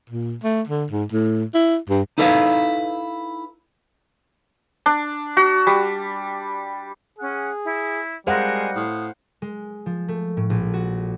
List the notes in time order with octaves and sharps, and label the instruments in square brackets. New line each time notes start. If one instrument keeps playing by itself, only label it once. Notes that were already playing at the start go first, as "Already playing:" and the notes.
[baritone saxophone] A#2
A3
D3
G#2
A2
E4
G2
[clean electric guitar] D#4 E4 A4 B4 C5 F5
[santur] D4
F#4
G3
[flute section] C#4 F#5 F#6 [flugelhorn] G#4
[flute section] E4
[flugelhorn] G3 [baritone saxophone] G#3 [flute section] A#4 D#5 G#5 [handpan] C5 F5 F#5
[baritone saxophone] A2 [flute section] D#6
[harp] G#3
F3
A3
A2
A#1
F#4